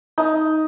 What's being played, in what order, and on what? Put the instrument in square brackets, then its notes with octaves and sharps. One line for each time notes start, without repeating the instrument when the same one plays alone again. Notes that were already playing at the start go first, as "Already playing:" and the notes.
[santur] D#4